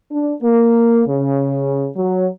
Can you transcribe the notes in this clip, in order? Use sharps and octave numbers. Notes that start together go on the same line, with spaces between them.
D4
A#3
C#3
F#3